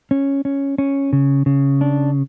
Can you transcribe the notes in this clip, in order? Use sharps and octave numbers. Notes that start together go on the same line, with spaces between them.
C#4
C#4
C#4
C#3
C#3
D4